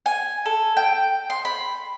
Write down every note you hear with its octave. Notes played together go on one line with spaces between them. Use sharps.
G#5
A4
G5
C6
B5